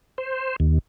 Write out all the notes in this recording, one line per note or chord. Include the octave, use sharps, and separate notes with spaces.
C5
D#2